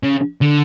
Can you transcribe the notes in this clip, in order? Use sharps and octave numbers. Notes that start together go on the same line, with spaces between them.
C#3
D3